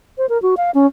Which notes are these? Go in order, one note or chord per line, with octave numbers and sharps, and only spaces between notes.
C5
A#4
F#4
F5
C#4